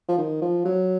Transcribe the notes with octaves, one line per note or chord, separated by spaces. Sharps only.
F3
D#3
F3
F#3